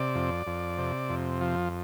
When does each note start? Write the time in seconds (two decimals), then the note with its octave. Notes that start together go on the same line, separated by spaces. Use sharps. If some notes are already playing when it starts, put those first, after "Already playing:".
Already playing: C3 D5
0.15 F2
0.47 F2
0.78 C3
1.09 F2
1.41 F3